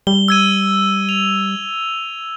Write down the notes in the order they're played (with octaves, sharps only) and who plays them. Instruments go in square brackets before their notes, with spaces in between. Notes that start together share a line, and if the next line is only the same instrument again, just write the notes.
[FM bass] G3 [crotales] G7
[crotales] E6 G#6 D#7
F7